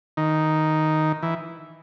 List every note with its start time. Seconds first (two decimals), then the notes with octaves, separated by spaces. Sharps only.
0.17 D#3
1.23 E3